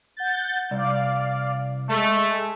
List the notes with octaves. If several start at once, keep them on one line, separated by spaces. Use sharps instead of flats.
F#5 G6 A6
C2 D5 F5
G#3 A3